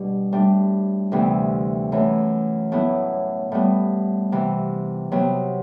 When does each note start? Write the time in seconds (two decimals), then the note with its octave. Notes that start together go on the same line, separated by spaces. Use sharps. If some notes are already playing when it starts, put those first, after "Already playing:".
Already playing: B2 G3 D4
0.33 A2 G3 D4
1.12 D2 C3 E3 B3
1.92 F#2 E3 A3
2.72 A2 F#3 B3 E4
3.52 A2 G3 B3
4.32 C3 E3 B3
5.12 C3 F#3 B3